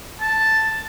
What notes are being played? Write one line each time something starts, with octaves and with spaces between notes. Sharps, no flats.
A5